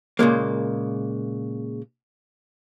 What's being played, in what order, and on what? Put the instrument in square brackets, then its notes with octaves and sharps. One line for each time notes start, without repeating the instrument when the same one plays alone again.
[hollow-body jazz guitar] A#2 C#3 G#3 A#3